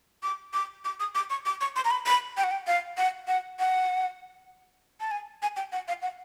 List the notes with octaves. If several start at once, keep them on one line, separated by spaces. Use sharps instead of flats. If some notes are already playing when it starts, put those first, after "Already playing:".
D6
D6
D6
D#6
D6
C#6
D6
C#6
C6
A#5
B5
B5
G5
F#5
G5
F5
F#5
F#5
F#5
A5
G#5
G#5
G5
F#5
F5
F#5